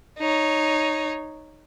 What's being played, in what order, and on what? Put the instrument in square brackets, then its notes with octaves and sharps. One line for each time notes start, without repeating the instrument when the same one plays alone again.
[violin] D#4 C#5